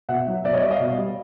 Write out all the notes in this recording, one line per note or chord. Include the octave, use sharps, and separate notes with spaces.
B2 E5 F#5
F#3
B2 D5 E5
C#5 D#5
G3 D5 E5
D#5 F5
B2
G3